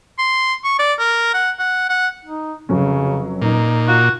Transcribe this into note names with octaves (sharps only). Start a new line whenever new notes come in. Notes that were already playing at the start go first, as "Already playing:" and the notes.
C6
C#6
D5
A#4
F#5
F#5
F#5
D#4
F1 C#3 F#3 C#4
A#2 D#4
F4 F#4